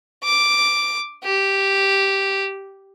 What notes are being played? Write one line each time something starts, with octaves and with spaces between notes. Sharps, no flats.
D6
G4